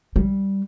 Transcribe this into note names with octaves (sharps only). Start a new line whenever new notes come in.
G3